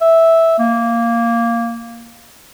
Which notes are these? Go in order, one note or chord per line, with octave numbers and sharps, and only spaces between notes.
E5
A#3